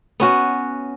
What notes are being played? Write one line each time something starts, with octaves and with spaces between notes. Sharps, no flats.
B3 C#4 F#4